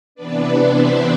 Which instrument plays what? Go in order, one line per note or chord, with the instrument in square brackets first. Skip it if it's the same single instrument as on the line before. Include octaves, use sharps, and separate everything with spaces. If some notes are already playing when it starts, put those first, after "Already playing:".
[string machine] C3 E3 B3 D4 B4 D5
C5 E5